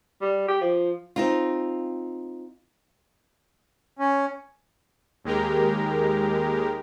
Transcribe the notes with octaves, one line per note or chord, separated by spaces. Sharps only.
G3
G4
F3
C4 D#4 F4
C#4
D#2 G#3 G4 A#4